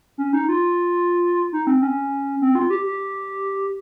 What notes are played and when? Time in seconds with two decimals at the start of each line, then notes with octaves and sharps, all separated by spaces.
0.18 C#4
0.33 D#4
0.49 F4
1.53 D#4
1.67 C4
1.82 C#4
2.41 C4
2.55 F4
2.70 G4
2.86 G4